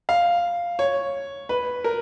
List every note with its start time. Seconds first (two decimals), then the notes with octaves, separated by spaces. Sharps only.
0.09 F5
0.79 C#5
1.49 B4
1.84 A#4